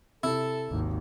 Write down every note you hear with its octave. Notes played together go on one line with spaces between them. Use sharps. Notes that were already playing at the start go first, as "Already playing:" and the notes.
C3 E4 A4
G#1 D#2